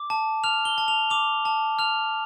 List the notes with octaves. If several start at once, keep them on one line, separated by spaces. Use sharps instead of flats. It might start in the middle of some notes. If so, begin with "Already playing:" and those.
Already playing: D6
A5
F6 F7
G7
A5
F7
D6 F7
A5
F6 F7